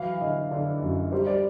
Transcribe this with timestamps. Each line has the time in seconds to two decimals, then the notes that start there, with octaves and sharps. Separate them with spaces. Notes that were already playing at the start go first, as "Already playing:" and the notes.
Already playing: E3 F#3 F5
0.20 D3 D#5
0.51 D3 D5
0.82 F#2
1.12 G3 C5
1.27 D5